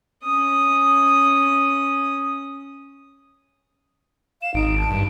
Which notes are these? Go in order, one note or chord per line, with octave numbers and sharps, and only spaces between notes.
C#4 D#6
F5 E7
G#1 D#4 D7
A5
G2